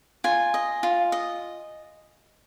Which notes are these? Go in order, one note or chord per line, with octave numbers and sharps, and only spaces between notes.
F4 G#5
D#5
F4
D#5